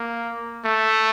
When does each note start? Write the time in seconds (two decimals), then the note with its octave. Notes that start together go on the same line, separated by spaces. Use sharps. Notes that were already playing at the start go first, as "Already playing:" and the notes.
Already playing: A#3
0.65 A3